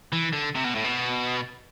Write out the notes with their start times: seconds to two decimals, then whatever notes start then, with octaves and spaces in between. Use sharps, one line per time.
0.12 E3
0.33 D3
0.55 C3
0.65 B2
0.75 A2
0.84 B2